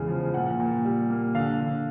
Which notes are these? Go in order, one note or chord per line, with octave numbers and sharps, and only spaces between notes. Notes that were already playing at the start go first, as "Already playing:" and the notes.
Already playing: E2 C#3 G#3
F3
A#2 F#5
A#2
G3
A#3
D3 F5
D3